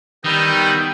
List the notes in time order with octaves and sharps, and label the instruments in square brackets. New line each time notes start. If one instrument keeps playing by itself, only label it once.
[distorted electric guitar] D#3 [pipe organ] G3 B3 E6 [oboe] D#4 [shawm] G5